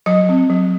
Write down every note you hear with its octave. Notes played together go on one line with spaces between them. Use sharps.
F#3 D#5
C4
F#3